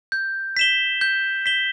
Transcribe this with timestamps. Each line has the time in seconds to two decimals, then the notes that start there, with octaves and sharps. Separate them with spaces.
0.12 G6
0.57 B6 E7 G7
1.01 G6
1.46 B6 E7 G7